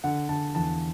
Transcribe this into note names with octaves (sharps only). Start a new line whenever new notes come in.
D3 F#5
D3 A5
E2 A5